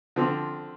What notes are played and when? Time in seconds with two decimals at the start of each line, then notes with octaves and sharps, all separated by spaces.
0.16 D3 F3 C4